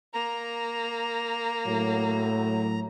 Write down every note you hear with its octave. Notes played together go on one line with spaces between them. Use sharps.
A#3 A#5
A2 F#3